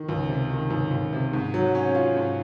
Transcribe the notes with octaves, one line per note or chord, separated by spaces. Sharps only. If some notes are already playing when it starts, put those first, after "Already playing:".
Already playing: D#3
C#2
C3
D#3
C#2
C#2
C3
G#2
F#3
C#4
F4
G#2